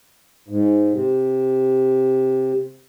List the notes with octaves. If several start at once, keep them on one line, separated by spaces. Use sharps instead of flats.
G#2
C3